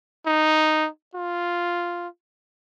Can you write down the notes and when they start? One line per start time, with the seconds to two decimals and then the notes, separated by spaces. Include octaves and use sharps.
0.27 D#4
1.15 F4